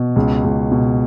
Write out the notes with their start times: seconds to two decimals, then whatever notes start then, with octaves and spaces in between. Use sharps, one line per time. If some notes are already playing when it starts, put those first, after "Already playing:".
Already playing: B2
0.16 C#2
0.44 C#2
0.72 B2